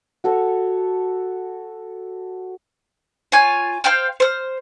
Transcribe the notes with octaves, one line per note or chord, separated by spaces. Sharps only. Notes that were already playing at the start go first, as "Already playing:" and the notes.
F#4 A4 C#5
F4 C#5 G#5
C5 F5 G5 F6
C5 F6